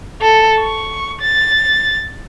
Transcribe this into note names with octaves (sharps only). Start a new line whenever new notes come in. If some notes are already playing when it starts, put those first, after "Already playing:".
A4
C#6
A6